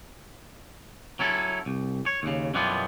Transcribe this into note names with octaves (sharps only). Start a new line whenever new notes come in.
F#3 C#4 E4 A4
C2
C#5
D#2 C#3
F#2 B2 E3 G3 B3 F4